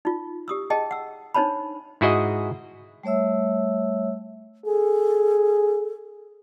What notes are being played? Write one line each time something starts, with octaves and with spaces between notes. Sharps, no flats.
D#4 F4
G4 D#6 E6
G#4 D#5 G5 A5
F#5 E6
D4 D#4 C5 C#5 A5 B5
G#2 E4 F#4 G#4 D#5
G3 A3 C#5 E5 E6
G#4 A4